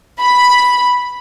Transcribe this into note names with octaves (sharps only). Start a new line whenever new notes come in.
B5